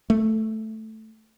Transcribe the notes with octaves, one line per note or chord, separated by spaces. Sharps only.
A3